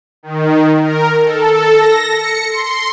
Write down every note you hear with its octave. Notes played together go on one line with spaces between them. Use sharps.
D#3
A#4
A4
A#6
C#7
C6